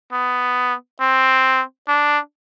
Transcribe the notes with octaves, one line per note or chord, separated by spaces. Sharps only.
B3
C4
D4